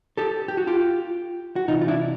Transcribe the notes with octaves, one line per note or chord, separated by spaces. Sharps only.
G4 A4
G4
F#4
F4 G4
F#4
C3 E3 D#4 F4
F4
D4 E4